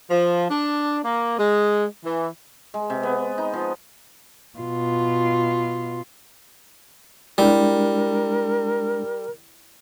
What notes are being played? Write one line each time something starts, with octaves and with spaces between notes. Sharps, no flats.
F3
D4
A#3
G#3
E3
G#3
C3
B3
D#4
F3
B2 F4
G3 G#3 D4 E4 G4 A#4